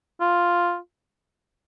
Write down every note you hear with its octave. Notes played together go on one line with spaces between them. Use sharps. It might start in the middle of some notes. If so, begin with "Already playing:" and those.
F4